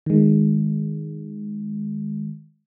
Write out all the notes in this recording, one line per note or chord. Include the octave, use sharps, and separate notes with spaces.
D#3 G#3